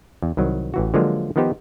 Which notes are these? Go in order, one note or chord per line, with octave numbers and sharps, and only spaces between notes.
E2
C2 D#3 F#3
A1 E3 F#4
D3 F3 F#3 G#3 A#3 F4
D#3 F3 B3 D#4 G4 C5